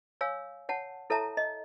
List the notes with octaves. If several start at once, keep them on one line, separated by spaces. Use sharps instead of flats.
C#5 F5 G#5 E6
C#5 F#5 A5
E4 A4 C#5 E5 A5 A#5
D#5